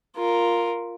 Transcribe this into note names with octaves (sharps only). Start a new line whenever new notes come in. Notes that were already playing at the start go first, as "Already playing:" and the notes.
F4 A#4